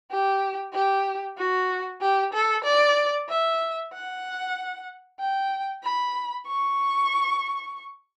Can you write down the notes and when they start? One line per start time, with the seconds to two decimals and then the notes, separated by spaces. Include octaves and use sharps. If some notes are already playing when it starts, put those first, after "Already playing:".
0.11 G4
0.73 G4
1.38 F#4
2.01 G4
2.33 A4
2.64 D5
3.29 E5
3.93 F#5
5.20 G5
5.83 B5
6.47 C#6